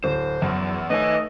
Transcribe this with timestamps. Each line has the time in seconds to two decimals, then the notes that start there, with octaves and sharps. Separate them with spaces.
0.04 D1 C5
0.42 F#2 E3 B3
0.90 A3 D#4 B4 C#5 D#5 G#5